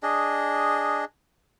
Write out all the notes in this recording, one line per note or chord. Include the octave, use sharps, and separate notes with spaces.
D4 G#4 D#5